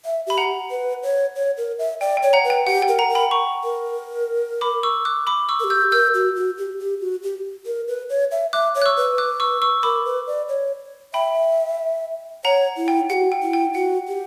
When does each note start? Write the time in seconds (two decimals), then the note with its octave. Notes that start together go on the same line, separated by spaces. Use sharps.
0.05 E5
0.27 G4 B5
0.38 F#5 A#5
0.71 B4
1.03 C#5
1.36 C#5
1.57 A#4
1.79 E5
2.01 D5 G5
2.17 G5
2.23 C#5
2.33 F#5 A#5
2.44 B4
2.50 G5
2.66 G4 F#5
2.82 G5
2.88 A#4
2.99 F#5 A#5
3.09 A#4
3.15 G5 B5
3.31 A#5 C#6
3.64 A#4
4.61 B5 D6
4.83 C#6 E6
5.05 D6 F#6
5.27 B5 D6
5.49 C#6 E6
5.60 A#4
5.64 G4
5.70 E6 G6
5.92 A#4 E6 G6
6.14 F#4
6.35 F#4
6.58 G4
6.79 G4
7.00 F#4
7.23 G4
7.66 A#4
7.88 B4
8.09 C#5
8.31 E5
8.53 E5 D6 F#6
8.75 C#5
8.82 F#6
8.86 C#6 E6
8.97 B4
9.18 D6 F#6
9.40 C#6 E6
9.62 C#6 E6
9.83 A#4 B5 D6
10.05 B4
10.27 D5
10.49 C#5
11.14 E5 G5 B5
12.44 C#5 F#5 A#5
12.77 E4
12.88 G5
13.10 F#4 G4 F#5
13.32 G5
13.42 E4
13.53 G5
13.75 F#4 F#5
14.08 G4